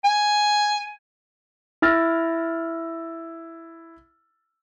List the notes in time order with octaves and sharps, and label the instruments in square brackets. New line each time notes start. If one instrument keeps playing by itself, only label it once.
[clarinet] G#5
[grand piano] E4 E6 F6 A6 A#6